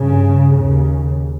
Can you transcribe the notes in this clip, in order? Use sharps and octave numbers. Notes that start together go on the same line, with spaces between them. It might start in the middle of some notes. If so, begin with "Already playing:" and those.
Already playing: G2 C#3
D#2 C#3